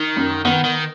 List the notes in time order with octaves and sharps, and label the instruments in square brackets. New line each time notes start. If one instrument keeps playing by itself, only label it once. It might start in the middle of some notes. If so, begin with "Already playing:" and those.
Already playing: [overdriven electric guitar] D#3
[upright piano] F#2
[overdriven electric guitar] D#3 [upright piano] B3
[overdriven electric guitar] D#3